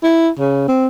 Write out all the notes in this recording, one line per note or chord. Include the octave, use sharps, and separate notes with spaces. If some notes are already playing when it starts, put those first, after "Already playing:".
E4
C#3
C4